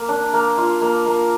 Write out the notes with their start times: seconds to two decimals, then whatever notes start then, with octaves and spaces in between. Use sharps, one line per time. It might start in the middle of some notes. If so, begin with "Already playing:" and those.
Already playing: A#3
0.09 D4
0.34 A#3
0.58 F4
0.82 A#3
1.06 A#3